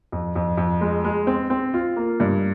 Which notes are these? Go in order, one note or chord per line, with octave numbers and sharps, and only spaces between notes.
F2
F2
F2
G#3
G#3
C4
C4
F4
A#3
G2